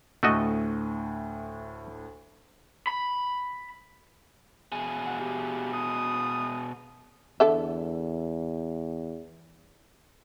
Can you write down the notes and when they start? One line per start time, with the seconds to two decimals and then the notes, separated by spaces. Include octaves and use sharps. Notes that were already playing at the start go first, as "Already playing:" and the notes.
0.23 D2 A2 A3 F#4 D#5
2.87 B5
4.72 B2 G#4
5.07 F#5
5.21 G4
5.74 D#6
7.40 E2 D3 A4 E5